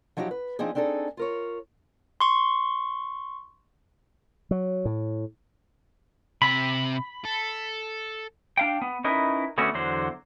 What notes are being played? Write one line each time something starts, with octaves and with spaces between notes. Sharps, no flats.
F3 F#3 D#4 F#4 G4
B4
F3 C4 D4 D#4 G#4
C4 D4 D#4 G#4 A4
F4 A#4 C#5
C6 C#6
F#3
A2
C3 E5 B5
A4
D4 F5 G5
B3
C#4 D#4 E4 A#4 B4
D3 A3 B3 C#4 F#4
E2 D3 F#3 C5